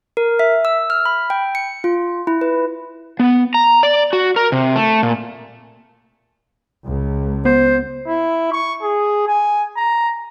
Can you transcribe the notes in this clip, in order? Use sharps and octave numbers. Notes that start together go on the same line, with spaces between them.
A#4
E5
E6
F6
B5
G5
C#7
F4
E4
B4
B3
A#5
D5
F#4
A#4
C3
A3
A#2
C#2
B3 C5
E4
C#6
G#4
G#5
A#5